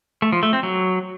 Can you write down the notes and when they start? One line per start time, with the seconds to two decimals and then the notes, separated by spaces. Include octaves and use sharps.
0.22 A3
0.32 F3
0.43 A3
0.53 C4
0.63 F#3